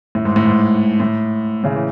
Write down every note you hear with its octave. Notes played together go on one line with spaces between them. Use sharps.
A2
G#2
A2
G#2
A2
A2 C#3
E3